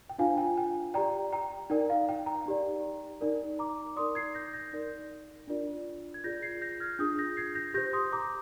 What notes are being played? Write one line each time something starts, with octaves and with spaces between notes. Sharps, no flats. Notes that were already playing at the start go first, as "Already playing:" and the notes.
G5
D4 F4 C5 F5 G#5
G5
G5
G4 D5 G5 A#5
G5 A#5
D#4 A#4 D5 G5
F5
G5
G5 A#5
D#4 G4 D5
D#4 A#4 D5
A#5 D6
D#4 A#4 D5 C6 D#6
G#6 C7
G6 A#6
G6 A#6
D#4 A#4 D5
D4 F4 A#4 D5
G#6
F4 G#4 D5 G6 A#6
G#6 C7
G6 A#6
F6 G#6
D4 F4 G#4 D#6 G6
G6 A#6
G#6 C7
G6 A#6
G4 C5 G6 A#6
C6 D#6
A#5 D6